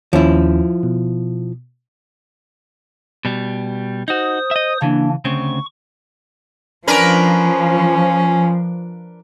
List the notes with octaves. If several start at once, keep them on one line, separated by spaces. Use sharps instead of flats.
D#2 F3 C#4 E4
B2
B2 G3
D#4 F#4 C5 D#6
D#5 E5
C#3 E3 A#3 D4
D2 C#3 C4 C#6
F3 C#4 D4 A#4 B4